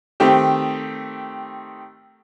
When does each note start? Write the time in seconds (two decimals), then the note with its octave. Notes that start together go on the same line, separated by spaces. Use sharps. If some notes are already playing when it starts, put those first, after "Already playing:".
0.20 D#3 A3 C4 G4